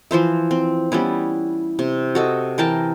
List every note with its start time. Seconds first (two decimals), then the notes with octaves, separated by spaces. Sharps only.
0.11 E3 F3 C5 E5
0.51 C4
0.92 G3 B3 C#4 E4
1.79 C3
2.15 F#4 A4 D#5
2.58 E3 A#4 G5 A5